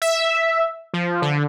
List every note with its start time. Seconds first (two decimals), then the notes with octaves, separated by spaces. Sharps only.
0.02 E5
0.94 F3
1.22 D3